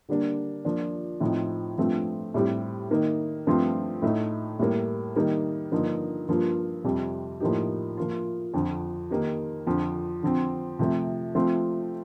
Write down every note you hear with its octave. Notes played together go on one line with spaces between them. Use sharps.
D3 G3 A#3 D4
F3 A#3 D4 F4
A2 F3 C4 D#4
G2 F3 A3 C4 F4
A2 G3 C4 G4
D#3 A#3 D#4
G2 F3 A3 C4 F4
A2 A3 D#4
A2 G3 A#3
D#3 G3 A#3 D#4
G2 D3 F3 A#3 D#4
G2 F3 A#3 F4
F2 C3 G3
A2 F3 A#3 D#4 G4
F3 A#3 F4
F2 D3 F3
D#3 A#3 D#4 G4
F2 D3 F3
D3 F3 C4
C3 F3 A3
F3 A3 C4 F4